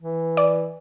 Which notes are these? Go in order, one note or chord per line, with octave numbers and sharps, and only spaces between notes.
E3
D5